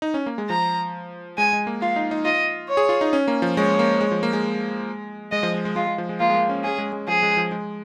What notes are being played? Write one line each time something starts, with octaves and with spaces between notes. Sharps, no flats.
D#4
C#4
A#3
G#3
F3 A#5
G#3 G#5
G#3
A#3
F4 F5
D#4
D#4
F4 D#5
C#5
G#4
F4
D#4
C#4
A#3
F3
G#3 C#5
A#3
G#3
F3
A#3
G#3
G#3 D#5
F3
G#3
G#3
G#3 F4
G#3
F3
G#3
A#3 F4
G#3
A#3
C#4
C#4 G#4
G#3
G#3
F3 G#4
G#3
F3
G#3